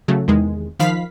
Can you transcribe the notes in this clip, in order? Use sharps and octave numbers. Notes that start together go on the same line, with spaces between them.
C#3 F#3 A3
E2 C3 D#3 G#3
D#3 F3 F5 B5 B6